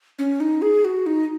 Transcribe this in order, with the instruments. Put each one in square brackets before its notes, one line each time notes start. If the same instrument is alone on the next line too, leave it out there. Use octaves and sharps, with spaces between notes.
[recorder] C#4
D#4
G#4
F#4
D#4